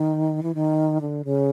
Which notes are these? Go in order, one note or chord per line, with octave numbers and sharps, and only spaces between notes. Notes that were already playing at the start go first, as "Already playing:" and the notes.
Already playing: D#3
E3
D#3
D3
C#3